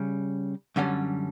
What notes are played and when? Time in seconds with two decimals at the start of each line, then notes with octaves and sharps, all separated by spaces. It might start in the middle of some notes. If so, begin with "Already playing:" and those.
Already playing: C#3 G3 C#4
0.76 F#2 D3 G3 C#4